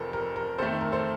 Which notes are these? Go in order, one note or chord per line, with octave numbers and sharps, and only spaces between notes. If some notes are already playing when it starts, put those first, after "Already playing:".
Already playing: F1 F2 C3 F3 A4 A#4
A#4
A#4
F2 D#3 A3 A4 C5
A#4
A4 C5